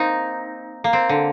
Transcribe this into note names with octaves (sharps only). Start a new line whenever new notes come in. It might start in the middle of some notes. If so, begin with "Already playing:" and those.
Already playing: A#3 C4 D#4
A#3
C4
D3